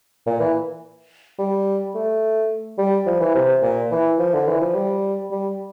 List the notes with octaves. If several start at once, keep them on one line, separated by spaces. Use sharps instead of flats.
A#2
E3
G3
A3
G3
F3
E3
C3
A#2
E3
F3
D3
E3
F3
G3
G3